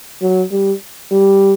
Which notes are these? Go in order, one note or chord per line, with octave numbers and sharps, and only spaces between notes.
F#3
G3
G3